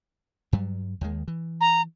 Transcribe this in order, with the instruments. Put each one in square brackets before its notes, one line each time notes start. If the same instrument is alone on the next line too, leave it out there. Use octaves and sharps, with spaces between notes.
[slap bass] G2 F#3 G3
D#2 D#3 G#3
E3
[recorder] A#5